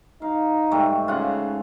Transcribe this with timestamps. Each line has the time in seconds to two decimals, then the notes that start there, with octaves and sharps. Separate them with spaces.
0.22 D#4 F5
0.71 G#2 G3 A3
1.08 C#3 F4 F#5